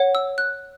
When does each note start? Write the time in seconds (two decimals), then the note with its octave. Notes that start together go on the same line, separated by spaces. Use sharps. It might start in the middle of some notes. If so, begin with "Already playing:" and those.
Already playing: C#5 F#5
0.15 E6
0.38 F#6